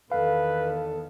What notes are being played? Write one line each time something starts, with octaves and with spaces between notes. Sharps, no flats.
E2 D#3 A4 B4 F5